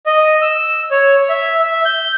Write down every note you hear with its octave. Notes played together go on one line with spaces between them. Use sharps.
D#5
E6
C#5
E5
E5
G6